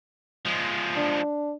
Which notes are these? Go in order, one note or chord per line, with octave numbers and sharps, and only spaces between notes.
F3 G#3
D4